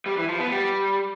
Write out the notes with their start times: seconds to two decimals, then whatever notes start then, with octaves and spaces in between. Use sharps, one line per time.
0.06 G3
0.17 E3
0.29 F3
0.40 B3
0.51 G3